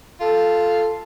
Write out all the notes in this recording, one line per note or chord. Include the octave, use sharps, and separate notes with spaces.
F4 A4